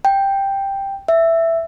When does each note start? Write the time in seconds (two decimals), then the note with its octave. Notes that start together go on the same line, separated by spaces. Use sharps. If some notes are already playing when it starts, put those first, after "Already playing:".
0.05 G5
1.08 E5